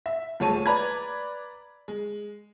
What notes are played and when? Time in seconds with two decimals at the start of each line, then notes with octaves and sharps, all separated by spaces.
0.06 E5
0.40 D#1 G#3 A3 C#5 A5 D#7
0.66 B4 D5 A#5 B5 G#6
1.88 G#3